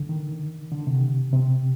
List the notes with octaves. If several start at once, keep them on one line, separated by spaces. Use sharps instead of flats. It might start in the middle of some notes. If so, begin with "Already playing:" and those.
Already playing: D3
D#3
D3
C3
C3